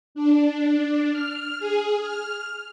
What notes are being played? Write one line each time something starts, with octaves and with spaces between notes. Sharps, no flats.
D4
F6
G#4
F6